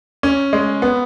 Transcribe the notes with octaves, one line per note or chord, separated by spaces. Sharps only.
C#4
G#3
B3